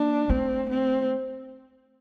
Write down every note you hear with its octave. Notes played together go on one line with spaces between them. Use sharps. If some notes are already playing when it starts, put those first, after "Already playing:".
Already playing: A#3 D4
A3 C4
C4